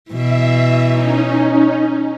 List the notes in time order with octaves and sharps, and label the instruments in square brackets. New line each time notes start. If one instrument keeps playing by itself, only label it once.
[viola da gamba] B2 E3 [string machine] E5
[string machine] C#4 D#4